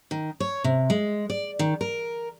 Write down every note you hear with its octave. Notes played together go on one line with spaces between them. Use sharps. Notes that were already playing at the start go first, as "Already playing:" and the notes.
D#3
C#5
C3
G#3
D5
D#3
A#4